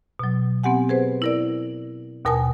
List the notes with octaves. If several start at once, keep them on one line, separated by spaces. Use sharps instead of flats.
B2 F#3
B3 C4 G4 F#5 G#5
G#4 B4 C5
E4 A#4 D5
D#2 B2 A#4 G#5 A5 D#6